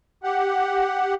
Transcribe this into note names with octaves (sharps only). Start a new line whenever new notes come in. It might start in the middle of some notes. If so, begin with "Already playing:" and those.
G4 F#5